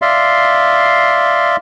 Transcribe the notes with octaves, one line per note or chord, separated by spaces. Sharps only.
D5 E5 F5 C6